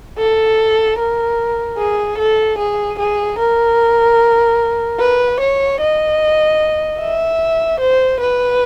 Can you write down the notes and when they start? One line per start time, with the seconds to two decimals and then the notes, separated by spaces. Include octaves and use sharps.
0.18 A4
0.99 A#4
1.78 G#4
2.19 A4
2.58 G#4
2.99 G#4
3.39 A#4
4.99 B4
5.40 C#5
5.81 D#5
7.00 E5
7.81 C5
8.20 B4